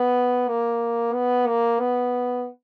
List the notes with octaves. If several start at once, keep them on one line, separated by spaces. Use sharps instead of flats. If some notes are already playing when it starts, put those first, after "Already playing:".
Already playing: B3
A#3
B3
A#3
B3